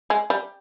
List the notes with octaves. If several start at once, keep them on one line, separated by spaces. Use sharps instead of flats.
G#3
G3